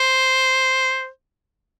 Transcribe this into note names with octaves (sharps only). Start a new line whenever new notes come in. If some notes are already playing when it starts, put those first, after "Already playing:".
Already playing: C5